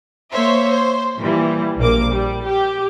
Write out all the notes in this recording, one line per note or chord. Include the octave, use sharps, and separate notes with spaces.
A#3 C5 C#5 E5
C5
A#2 E3 G3
A#1 A#3 D6
G3
G4